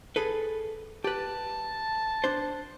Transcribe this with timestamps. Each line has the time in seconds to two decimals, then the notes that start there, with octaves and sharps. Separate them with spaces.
0.16 G#4 A4 B4
1.04 G4 B4 A5
2.24 D4 C5